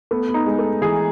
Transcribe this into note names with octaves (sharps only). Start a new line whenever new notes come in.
A3 B3
B3
D#4
G#3
A3
E3 G#4